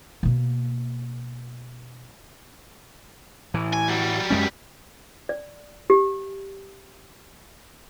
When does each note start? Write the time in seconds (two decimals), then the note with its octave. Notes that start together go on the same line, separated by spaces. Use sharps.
0.23 B2 A#3
3.54 A2 E3
3.73 G#5
3.88 F#3 G3
4.30 F#2 G#3 C#4
5.29 D5
5.90 G4